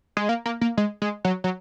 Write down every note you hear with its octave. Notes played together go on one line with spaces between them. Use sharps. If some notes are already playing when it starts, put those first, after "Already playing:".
G#3
A#3
A#3
A#3
G#3
G#3
F#3
F#3